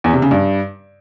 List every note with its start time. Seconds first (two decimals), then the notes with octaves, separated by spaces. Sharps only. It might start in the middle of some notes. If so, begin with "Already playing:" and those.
0.04 E2
0.13 C3
0.22 C#3
0.31 G2